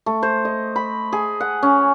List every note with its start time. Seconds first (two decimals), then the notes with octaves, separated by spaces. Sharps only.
0.06 A3
0.23 C5
0.45 D#5
0.76 B5
1.13 G#4
1.41 F#5
1.63 C#4